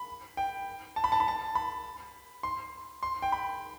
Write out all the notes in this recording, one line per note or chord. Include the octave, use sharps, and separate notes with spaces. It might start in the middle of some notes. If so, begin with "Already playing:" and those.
Already playing: B5
G5
A5
B5
A5
B5
A5
B5
C6
C6
G5
B5